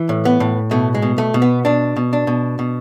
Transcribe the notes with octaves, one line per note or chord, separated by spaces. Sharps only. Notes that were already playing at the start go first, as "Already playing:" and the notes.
Already playing: E3
A2
B3
A2
B2 A3
G#3
B2
A3
B2
B3
B2 D4
B2
D4
B2
B2